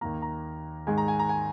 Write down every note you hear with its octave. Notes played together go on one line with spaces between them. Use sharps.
D#2 D#3 A#3 A#5
A#5
G#2 D#3 G#3 G#5
A#5
G#5
A#5
G#5